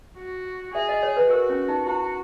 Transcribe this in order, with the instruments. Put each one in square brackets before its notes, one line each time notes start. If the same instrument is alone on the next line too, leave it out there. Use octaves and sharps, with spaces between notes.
[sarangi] F#4
[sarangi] G#4 [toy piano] E5
[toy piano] D#5
C#5
B4
[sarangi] F#4 [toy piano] A#4
[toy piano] C#4
D#4
[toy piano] E4 [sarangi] F#4